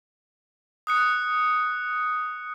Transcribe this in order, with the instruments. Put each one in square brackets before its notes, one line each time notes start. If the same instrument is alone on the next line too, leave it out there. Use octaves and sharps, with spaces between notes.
[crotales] D#6 F#6 C#7